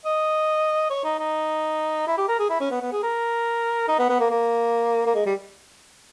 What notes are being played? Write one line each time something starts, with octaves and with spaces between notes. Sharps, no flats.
D#5
C#5
D#4
D#4
E4
G4
A#4
G#4
E4
C#4
B3
B3
G#4
A#4
D#4
B3
B3
A#3
A#3
A#3
G#3
G3